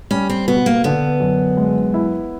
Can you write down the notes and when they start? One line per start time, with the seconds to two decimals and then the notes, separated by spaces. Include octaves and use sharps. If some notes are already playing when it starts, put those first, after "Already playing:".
0.11 G3 C#4
0.29 C4
0.47 B2 B3
0.66 A#3
0.84 D3 B3
1.20 F#2
1.57 G#3
1.94 E4